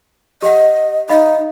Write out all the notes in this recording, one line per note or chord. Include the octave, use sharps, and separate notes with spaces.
G4 D#5 F#5
D#4 D#5 F5 B5